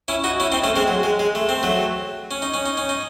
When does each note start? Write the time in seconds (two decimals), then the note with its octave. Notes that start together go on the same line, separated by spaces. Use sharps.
0.08 C#4 E4
0.24 D#4 F#4
0.40 C#4 E4
0.52 C4 D#4
0.64 A3 C#4
0.76 G#3 C4
0.88 F#3
1.03 G#3
1.20 G#3
1.35 A3
1.49 C4
1.63 F#3 A3
2.31 C#4
2.42 D#4
2.54 C#4
2.66 D#4
2.77 C#4
2.89 D#4